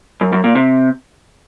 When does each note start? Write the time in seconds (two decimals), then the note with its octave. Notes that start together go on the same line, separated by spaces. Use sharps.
0.21 F#2
0.32 F#2
0.44 A#2
0.55 C3